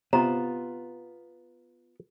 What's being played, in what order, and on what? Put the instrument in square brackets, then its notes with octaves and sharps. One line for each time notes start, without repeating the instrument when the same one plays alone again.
[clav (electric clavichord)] C3 [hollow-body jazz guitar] B3 F4 [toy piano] A#5